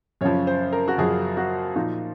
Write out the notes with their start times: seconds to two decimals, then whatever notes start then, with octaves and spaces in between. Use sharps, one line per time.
0.21 F#2 C#3 F3 C#5
0.47 C5
0.72 A#4
0.88 F#4
0.98 F#2 C#3 F3 G#4
1.37 F#4
1.76 A#2 F3 D#4